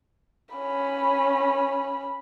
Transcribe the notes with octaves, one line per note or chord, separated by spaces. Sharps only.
C#4 B5